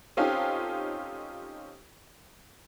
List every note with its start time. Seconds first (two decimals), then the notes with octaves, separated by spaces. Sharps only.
0.17 C4 C#4 D#4 F4 G4 A4